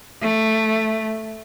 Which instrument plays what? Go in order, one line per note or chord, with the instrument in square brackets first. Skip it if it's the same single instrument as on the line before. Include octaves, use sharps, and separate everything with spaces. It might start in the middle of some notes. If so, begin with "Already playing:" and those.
[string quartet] A3